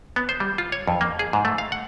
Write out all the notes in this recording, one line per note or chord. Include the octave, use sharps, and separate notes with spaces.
B3
C5
G3
F4
C#5
F2
A#3
G#4
G#2
A3
F5
F#5